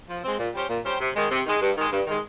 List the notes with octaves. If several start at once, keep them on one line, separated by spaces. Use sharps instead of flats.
F3
G#3 C4
A#2
G3 C#4 G4 C5
A#2
G3 C#4 G4 C5
C3
D#3 G#3
C3
D#3 G#3
G2
D#3 G#3
G2
D#3 G#3